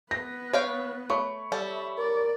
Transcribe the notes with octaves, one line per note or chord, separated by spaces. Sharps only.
B3 B4 A#6
C#5 F5 G5
A3 C#5 B5 C#6
G3 A4 E5
A#4 D5